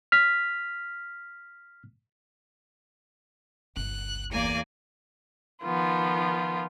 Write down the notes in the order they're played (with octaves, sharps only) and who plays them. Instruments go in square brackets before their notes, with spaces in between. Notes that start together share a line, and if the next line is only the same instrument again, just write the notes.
[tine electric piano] F6 B6
[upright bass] G1 C#2 [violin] F#6
[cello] E2 A#3 [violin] D5 G#5
[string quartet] D#3 F3 B3 F4